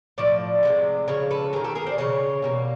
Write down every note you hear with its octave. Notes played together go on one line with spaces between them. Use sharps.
A2 F3 D5
C3 F3 G#3
C#3 F3 C#5
A4 B4
D#3 G#3 G#4 A#4
G4 A4
G#4 A#4
C5 D5
C#3 E3 C#5
B2 G3 A#3